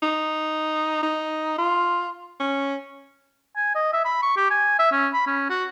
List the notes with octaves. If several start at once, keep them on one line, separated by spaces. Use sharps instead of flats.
D#4
D#4
F4
C#4
G#5
D#5
E5
B5
C#6
G4
G#5
E5
C#4
B5
C#4
F#4